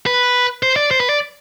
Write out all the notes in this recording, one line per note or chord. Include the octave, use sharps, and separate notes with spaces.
B4
C5
D5
C5
B4
D5